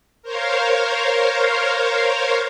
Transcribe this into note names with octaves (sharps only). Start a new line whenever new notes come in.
A#4 C5 C#5 F5